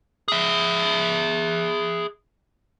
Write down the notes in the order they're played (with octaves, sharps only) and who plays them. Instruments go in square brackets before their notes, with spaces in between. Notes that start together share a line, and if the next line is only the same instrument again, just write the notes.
[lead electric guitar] G#4 E5